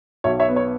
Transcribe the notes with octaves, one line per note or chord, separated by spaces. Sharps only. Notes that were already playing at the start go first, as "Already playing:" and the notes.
B1 C#5 E5
C#5 E5
B3
C#5